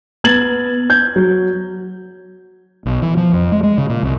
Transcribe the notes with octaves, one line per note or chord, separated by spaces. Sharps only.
B3 G#6 A6 F#7
G6 G#6
F#3
B1
E3
F3
F2
G#3
G#3
C#3
A#2
C2